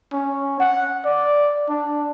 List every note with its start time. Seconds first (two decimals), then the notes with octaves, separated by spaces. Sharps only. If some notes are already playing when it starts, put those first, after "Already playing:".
0.13 C#4
0.60 F#5
1.06 D5
1.69 D4